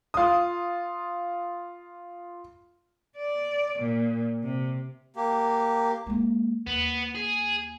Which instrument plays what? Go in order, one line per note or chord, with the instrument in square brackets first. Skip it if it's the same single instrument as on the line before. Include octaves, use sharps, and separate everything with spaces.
[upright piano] F4 D#6
[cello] D5
A#2
C3
[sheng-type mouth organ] A#3 G4
[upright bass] G#3 A#3
[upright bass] D#2 [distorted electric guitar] B3
[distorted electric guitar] G#4